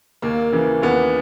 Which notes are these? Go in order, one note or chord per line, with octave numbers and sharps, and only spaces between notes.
D#2 A#3
C#3 E3
D#2 B3